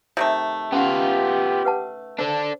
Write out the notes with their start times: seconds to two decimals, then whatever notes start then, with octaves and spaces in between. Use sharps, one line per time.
0.17 C3 D#3 A3
0.72 B3 C#4 F4 G4 F#5
1.65 B4 F#5 A5
2.19 D4 A4 C5